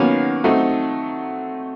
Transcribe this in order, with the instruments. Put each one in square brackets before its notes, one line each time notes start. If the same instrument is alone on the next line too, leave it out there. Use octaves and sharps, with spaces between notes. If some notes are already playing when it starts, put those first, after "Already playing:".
Already playing: [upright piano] D#3 F#3 A#3 [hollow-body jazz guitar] B3 C#4
[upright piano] F#3 A3 C4 D#4